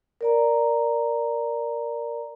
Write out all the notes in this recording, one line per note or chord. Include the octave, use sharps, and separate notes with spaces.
A#4 D5 A#5